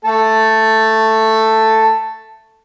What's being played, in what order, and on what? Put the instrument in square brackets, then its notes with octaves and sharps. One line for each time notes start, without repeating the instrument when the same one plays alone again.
[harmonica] A3 A4